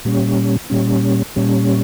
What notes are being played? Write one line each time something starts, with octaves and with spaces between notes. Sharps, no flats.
A#2 G3 C#4
A#2 G3 C#4
A#2 G3 C#4